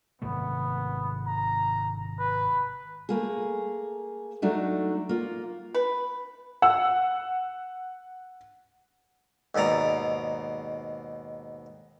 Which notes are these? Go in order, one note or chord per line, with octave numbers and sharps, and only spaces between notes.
G#1 C3 A3 B3
A#5
B4
A3 A#3 G#4
F#3 A3 D4 D#4
A#3 F4
B4
F#5 E6
D#2 G#2 B2 D5 A#5